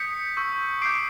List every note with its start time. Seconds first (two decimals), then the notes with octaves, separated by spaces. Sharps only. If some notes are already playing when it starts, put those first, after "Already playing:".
Already playing: D#6 G6 B6 C#7
0.37 C#6 E6 G6
0.81 D6 G6 C7 D7